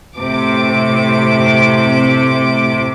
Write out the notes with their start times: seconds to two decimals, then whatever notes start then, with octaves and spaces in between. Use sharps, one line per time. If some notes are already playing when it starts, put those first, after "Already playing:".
0.16 A2 C3 D6